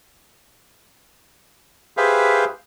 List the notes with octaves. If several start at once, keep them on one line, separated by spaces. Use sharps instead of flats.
G4 G#4 B4 C5 E5 F5